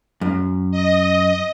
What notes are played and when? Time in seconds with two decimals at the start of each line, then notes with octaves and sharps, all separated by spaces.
0.21 F#2
0.72 D#5